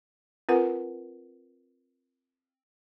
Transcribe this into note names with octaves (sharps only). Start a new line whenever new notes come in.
C4 F4 A#4 B4 F#5 G#5